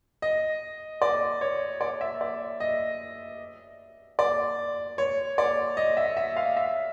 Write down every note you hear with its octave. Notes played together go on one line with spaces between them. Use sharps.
D#5
D5
C#5
D5
E5
D5
D#5
D5
C#5
D5
D#5
E5
E5
F5
E5